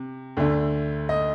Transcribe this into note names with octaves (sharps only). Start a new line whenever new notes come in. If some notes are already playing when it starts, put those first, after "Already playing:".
Already playing: C3
D2 D3 A3
D#5